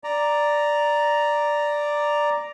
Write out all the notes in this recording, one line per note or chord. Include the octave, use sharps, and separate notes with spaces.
D5 A#5